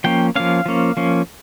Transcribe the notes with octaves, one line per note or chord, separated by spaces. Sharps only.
F3 A#3 C#4 G5
F3 A#3 C#4 F5
F3 A#3 C#4
F3 A#3 C#4